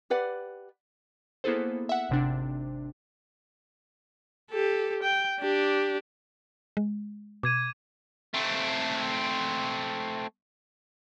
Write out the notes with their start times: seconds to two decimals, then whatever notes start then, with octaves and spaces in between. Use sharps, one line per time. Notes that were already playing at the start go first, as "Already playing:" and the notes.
0.10 G4 B4 D5 F#5
1.44 A#3 B3 E4 G#4 A4 C5
1.89 E5 F#5
2.10 G#1 C3 D4
4.51 G4 A4
5.03 G5
5.41 D4 G4
6.77 G#3
7.43 B2 D6 G#6 D#7
8.34 A3 C4